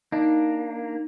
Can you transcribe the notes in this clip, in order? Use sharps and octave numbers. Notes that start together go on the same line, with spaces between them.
A#3 D4 D#4